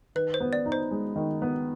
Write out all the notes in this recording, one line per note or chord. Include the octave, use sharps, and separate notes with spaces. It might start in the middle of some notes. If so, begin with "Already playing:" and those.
D#3 B4
C5
B3
D5
D#4
C5
G#3
D#3
B3